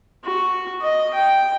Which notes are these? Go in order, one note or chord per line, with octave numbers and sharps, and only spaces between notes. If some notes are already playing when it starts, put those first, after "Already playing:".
F#4
D#5
G5